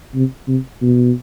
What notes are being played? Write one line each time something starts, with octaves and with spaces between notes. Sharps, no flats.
C3
C3
B2